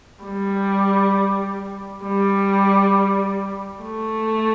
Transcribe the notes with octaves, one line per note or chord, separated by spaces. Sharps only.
G3
G3
A3